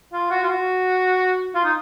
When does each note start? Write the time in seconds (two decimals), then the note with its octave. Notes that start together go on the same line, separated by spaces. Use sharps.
0.13 F4
0.31 F#4
0.43 F4
0.49 F#4
1.55 F4
1.64 D#4